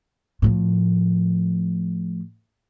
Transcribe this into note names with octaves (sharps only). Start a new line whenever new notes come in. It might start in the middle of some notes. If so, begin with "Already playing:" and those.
A2 F3